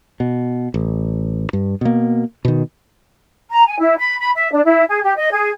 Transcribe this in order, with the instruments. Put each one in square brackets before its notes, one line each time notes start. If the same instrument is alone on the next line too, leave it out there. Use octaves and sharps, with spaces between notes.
[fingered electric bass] B2
A1
G2
B2 A#3
B2 D#3
[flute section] A#5
G#5
E4
B5
B5
E5
D4
E4
G#4
G4
D#5
G#4